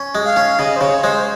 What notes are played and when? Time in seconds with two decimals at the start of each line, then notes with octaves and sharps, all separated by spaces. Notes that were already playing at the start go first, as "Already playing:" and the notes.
Already playing: C#4
0.15 G#3
0.25 F5
0.36 C#4
0.59 C#3 D#5
0.76 C5
0.81 C#3 C#5
1.03 G#3 C5